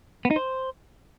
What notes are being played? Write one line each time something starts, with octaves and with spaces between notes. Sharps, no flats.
B3
D#4
C5